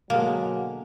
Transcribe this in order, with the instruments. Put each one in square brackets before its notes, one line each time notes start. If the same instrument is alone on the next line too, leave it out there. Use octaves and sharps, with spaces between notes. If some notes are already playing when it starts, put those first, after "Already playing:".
[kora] B2 D3 G#3 [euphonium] F#3 [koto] A#3 [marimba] F5